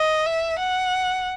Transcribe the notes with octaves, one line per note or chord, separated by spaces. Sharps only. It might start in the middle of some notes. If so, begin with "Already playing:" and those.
Already playing: D#5
E5
F#5